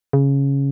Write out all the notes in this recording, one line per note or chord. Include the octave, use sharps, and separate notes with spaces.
C#3